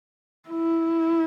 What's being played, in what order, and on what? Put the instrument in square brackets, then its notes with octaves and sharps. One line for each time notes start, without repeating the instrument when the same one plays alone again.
[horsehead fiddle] E4